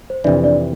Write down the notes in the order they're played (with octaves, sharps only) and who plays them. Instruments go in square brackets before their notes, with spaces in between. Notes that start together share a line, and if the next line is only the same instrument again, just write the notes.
[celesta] C5
[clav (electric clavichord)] F2 C3 E3 [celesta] D4 D5
[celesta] D4 D5